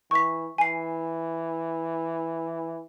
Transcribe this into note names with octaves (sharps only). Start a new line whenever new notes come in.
E3 C#6 B6
E3 G#5 C7